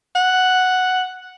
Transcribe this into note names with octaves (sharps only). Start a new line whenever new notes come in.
F#5